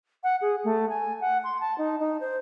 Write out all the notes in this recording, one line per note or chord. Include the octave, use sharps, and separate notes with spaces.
F#5
G#4
A3
G#5
F#5
C6
A5
D#4
D#4
C5